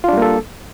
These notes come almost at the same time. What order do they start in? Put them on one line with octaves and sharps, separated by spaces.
F4 D4 G3 A#3 A4